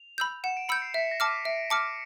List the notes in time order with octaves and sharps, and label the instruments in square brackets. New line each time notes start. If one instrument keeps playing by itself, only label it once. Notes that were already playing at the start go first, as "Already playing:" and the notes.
Already playing: [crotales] F7
[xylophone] B5 E6 G6
[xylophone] F#5 [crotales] E7
[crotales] D7
[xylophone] B5 E6 G6 [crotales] C#7
[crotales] C7
[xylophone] E5 [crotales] B6
[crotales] A#6
[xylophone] A5 D6 F6
[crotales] D#7
[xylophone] E5 [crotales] D7
[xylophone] A5 D6 F6 [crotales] C#7